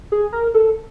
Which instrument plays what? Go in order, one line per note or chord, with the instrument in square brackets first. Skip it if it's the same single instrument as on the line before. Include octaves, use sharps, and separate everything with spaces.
[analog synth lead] G#4
A#4
A4